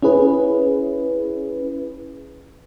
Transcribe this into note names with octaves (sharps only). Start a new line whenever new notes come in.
C#4 E4 G#4 B4